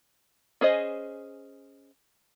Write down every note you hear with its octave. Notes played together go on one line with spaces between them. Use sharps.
C#4 G#4 C5 D#5